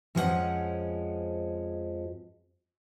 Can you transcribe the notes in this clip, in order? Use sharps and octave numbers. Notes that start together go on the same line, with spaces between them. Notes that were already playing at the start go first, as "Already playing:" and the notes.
F2 F3 G#3 C#4 E4 F#5